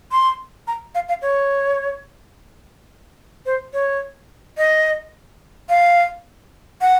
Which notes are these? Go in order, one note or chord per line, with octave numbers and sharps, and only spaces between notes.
C6
A#5
F5
F5
C#5
C5
C#5
D#5
F5
F#5